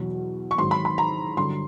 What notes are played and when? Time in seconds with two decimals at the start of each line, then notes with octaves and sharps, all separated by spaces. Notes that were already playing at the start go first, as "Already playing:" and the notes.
Already playing: E2 B2 F#3
0.51 C#6
0.58 G#2 D#3 F#3 C6
0.71 B5
0.85 B5
0.98 A#5
1.37 G2 D3 F#3 C6